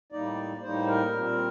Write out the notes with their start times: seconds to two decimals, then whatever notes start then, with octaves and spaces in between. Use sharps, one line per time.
0.12 A2 G3 A#3 D#4 D5
0.62 A2 G3 A#3 D#4 C5
0.88 A#4
1.13 A#2 G3 C4